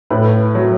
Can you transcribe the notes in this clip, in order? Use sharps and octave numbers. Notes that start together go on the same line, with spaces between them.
A2 B4
F#3